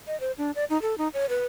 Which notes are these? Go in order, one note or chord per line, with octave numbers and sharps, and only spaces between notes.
D#5
C5
D4
D5
D#4
A4
D#4
C#5
B4